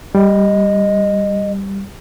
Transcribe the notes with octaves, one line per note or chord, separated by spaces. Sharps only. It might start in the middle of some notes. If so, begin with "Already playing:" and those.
G3 D#5